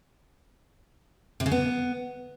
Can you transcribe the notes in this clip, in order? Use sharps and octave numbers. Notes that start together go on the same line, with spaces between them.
C3
C#3
B3